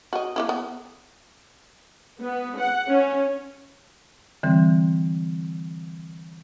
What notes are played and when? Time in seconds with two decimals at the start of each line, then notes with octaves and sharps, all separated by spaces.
0.13 F#4 D#5
0.36 A#3 D4 E4
0.49 B3
2.20 B3
2.58 F#5
2.89 C#4
4.43 D3 E3 G3 C4